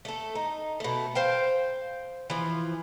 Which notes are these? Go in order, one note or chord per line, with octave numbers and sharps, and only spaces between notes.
A3 A4
D#4
B2 A3
C5 F5 G5
E3 F3